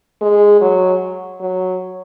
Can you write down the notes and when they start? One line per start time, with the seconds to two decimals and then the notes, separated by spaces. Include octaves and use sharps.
0.21 G#3
0.61 F#3
1.41 F#3